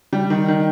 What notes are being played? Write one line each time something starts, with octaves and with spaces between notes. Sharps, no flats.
G3
D#3
D#3